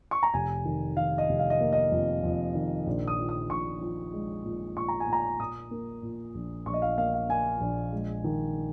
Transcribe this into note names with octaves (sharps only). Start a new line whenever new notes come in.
C#6
A#5
F1 G#5
D#3
D#3 F5
D#5
F1
F5
D#5
A#3
D#5
F2
F2
D#3
A#1
D#6
F3
D#6
A#1 C#6
F3
G#3
A#2
A#2 C#6
A#5
G#5
A#2
A#5
A#2 D#6
A#3
A#2
A#1
A#1 C#6
D#5
F5
A#3 F5
F5
A#3 G#5
A#1
G#3
D#3